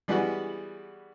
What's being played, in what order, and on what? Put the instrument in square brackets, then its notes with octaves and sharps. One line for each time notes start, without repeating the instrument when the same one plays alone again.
[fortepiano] E3 G3 G#3 B3 E4 F#4